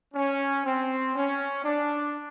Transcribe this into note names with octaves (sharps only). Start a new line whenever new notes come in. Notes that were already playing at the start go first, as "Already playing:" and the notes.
C#4
C4
C#4
D4